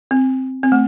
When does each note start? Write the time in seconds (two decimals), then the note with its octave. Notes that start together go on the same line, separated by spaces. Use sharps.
0.11 C4
0.63 C4
0.72 A3